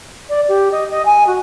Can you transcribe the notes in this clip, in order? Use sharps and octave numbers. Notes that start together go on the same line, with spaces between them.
D5
G4
D#5
D#5
G#5
F#4